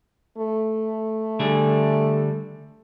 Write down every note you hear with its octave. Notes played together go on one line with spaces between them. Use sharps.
A3
D3 G3 G#4